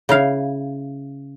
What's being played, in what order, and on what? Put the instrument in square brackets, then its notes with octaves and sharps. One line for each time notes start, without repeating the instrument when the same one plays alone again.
[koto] C#3 E4 F5